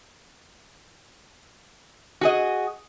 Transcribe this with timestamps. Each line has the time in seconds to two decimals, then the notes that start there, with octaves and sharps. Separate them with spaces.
2.21 F#4 G#4 D#5